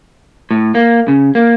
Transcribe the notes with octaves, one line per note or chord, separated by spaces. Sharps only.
A2
A#3
C#3
A#3